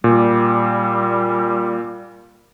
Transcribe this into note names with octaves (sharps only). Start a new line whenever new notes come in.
A#2 G3